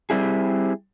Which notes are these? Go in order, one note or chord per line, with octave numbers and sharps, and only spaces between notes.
G3 C4 E4 G#4